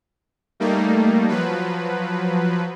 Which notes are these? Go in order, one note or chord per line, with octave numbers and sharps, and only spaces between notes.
G3 A3 A#3 D#4
F3 F#3 B4